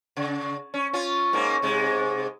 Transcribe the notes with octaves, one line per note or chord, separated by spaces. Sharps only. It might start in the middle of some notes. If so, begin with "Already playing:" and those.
C#3
C#4
C#4 F4
G#2 A#3 C#4
G#2 C3 G#3